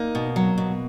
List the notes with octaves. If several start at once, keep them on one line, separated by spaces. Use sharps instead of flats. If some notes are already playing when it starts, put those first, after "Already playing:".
Already playing: A#3 D#4
B2
F#3
B2